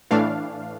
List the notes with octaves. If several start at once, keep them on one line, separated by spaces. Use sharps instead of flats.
A2 E3 A3 D4 F5